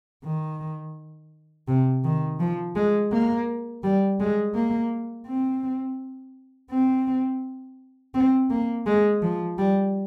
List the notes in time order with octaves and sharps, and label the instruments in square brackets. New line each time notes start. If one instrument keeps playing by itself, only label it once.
[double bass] D#3
C3
D#3
F3
G#3
A#3
G3
G#3
A#3
C4
C4
C4
A#3
G#3
F3
G3